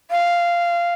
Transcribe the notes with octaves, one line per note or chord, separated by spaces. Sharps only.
F5